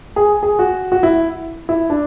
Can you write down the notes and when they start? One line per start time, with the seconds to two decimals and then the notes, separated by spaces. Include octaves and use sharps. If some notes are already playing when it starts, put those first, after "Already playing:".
0.16 G#4
0.43 G#4
0.59 F#4
0.92 F#4
1.03 E4
1.69 E4
1.90 D4